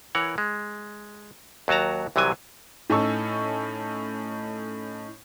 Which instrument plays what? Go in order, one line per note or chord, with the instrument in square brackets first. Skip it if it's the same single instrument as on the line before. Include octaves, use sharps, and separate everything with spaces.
[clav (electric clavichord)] E3 A#4 C#5 F#5
G#3
D#2 F#3 F#4 A5 A#5
C2 C3 E3 F#3 G#5
[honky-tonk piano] A2 C#4 D#4 A4 C#6 E6